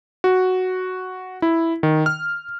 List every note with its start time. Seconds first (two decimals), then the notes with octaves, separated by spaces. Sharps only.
0.24 F#4
1.42 E4
1.83 D#3
2.06 F6